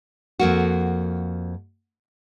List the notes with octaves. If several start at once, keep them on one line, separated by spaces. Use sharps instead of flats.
F2 A#3 F#4